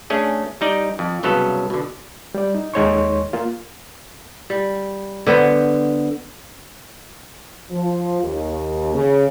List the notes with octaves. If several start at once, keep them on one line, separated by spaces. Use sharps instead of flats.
A3 C#4 D4 G#4
G3 D#4 D5
F2
C2 C#3 F#3 B3 A4 F5
B2 D3
G3 D5
D#4
D#2 G#3 D#4 C#5 C6 C#6
A#3 F4
G3
D3 B3 C5
F3
D#2
C#3